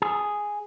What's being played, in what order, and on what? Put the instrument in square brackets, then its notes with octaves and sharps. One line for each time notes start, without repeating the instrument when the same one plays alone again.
[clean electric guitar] G#4